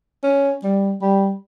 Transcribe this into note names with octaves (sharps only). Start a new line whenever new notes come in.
C#4
G3
G3